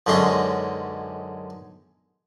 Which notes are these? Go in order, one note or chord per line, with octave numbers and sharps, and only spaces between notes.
B1 F#2 D3 G#3 C#4 C6